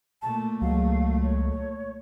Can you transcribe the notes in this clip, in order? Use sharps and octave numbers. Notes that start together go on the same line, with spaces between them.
A#2 A3 A5
C#2 F#3 G#3 F5
C#5